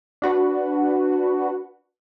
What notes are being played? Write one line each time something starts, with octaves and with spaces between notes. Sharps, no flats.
D4 F#4 B4